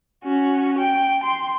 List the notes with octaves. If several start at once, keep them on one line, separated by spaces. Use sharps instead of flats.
C#4 F#4
G5
C6